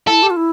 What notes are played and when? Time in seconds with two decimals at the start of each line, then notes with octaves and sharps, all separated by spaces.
0.07 E4 A4
0.23 G4
0.30 F4
0.37 E4